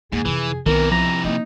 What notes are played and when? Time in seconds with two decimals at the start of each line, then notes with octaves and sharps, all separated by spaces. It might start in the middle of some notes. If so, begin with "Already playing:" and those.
0.12 D#2 G#2 A#3 G#4
0.25 F2 C3 E3
0.66 B1 C3 D#3 E3 B3 A#4
0.92 F3 A#5
1.24 A#3 C#4 D#4